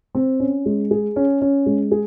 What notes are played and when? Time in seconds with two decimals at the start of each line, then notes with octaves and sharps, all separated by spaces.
0.15 C4
0.40 C#4
0.66 G#3
0.91 G#4
1.16 C#4
1.41 C#4
1.66 G#3
1.91 G#4